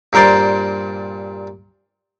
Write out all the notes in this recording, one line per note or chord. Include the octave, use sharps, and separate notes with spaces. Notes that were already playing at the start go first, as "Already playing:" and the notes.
G2 A#2 A#4 C5 D5 C6